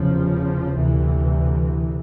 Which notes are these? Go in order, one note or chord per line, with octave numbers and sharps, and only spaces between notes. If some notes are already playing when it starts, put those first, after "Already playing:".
Already playing: F1 E2 C#3 F3
D2 C3 E3